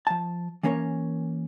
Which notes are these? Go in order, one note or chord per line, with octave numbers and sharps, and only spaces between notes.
F3 A5
E3 A#3 C#4 A#4 C#5